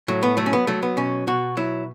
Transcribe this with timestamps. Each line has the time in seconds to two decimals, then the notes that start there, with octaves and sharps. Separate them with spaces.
0.08 A2 F#3
0.23 B3
0.37 F#3 A3
0.46 C#4
0.53 B3
0.67 F#3 A3
0.83 B3
0.97 B2 C#4
1.27 B2 F#4
1.57 F#3 E4